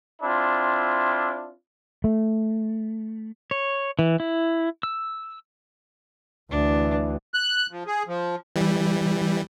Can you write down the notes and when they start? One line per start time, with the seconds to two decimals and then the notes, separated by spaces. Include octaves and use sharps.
0.22 C4 D4 E4 F4
2.04 A3
3.51 C#5
3.99 E3
4.20 E4
4.83 E6
6.51 D2 E3 D4
7.34 F#6
7.71 F3
7.87 G#4
8.08 F3
8.56 E3 G3